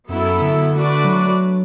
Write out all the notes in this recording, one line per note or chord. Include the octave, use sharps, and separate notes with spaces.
F#2 F#3 B3 E4 A4
D3
A3 D4 F#4 B4 D5
F#3